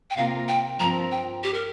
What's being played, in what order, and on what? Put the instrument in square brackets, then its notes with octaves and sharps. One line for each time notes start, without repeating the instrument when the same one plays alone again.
[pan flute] G5
[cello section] C3 A#3 F4 A#4 [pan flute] F5
[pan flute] G5
[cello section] G2 F3 C4 A#4 [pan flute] A#5
[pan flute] G5
G4
A#4